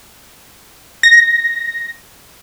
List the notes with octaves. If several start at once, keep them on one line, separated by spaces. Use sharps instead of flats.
A#6